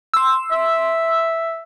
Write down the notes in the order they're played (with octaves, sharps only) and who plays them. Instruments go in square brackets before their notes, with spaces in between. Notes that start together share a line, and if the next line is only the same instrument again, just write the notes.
[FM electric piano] C6 E6
[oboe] E5